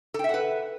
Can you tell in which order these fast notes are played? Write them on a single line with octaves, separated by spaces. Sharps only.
A4 G5 E5 F#5 B4